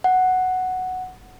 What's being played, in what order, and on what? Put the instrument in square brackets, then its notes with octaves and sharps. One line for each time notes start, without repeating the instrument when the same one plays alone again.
[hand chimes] F#5